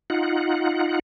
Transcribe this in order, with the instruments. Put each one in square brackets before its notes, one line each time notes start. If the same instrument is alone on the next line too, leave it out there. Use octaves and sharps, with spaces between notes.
[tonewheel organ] D#4 F4 F#5